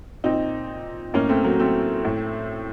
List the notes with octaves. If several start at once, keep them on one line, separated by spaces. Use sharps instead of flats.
A#2 C4 D#4
A2 A#3 C#4
A3 C4
F#3 A#3
A3 C4
A2